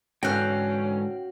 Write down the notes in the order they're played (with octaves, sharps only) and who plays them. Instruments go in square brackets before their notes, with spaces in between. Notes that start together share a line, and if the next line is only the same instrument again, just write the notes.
[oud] G#2 D3 E3 [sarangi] C#4 [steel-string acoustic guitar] F#4 F5 [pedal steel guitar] G5 F#6